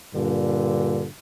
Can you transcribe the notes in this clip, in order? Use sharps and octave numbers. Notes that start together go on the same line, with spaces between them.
G2 A#2 D3